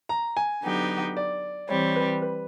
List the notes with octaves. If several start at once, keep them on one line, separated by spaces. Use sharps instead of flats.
A#5
G#5
D3 F#3 B3 D#4 G4
D5
E3 G3 C4 C#5
B4
B4